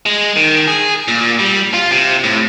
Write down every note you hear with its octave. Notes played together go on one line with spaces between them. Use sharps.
G#3
D#3
G#4
A#2
G3
F4
C3
A2